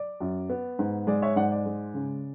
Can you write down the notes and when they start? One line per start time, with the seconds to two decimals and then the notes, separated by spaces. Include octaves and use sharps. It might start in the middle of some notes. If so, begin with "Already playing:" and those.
Already playing: D5
0.21 F#2
0.49 B3
0.79 G#2
1.07 G#3 D5
1.22 C#5 E5
1.36 G#2 D5 F#5
1.52 D5
1.65 G#3
1.94 C#3